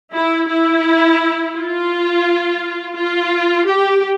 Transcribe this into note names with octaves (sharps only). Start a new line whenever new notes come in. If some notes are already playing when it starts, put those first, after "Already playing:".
E4
E4
F4
F4
G4